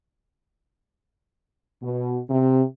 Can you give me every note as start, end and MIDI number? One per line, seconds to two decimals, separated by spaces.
1.82 2.19 47
2.30 2.62 48